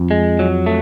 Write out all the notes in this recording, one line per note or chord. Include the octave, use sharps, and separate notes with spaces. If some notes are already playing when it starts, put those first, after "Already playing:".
Already playing: F2
G#3
F#3
A3